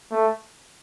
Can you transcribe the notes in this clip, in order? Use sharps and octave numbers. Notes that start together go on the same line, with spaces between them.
A3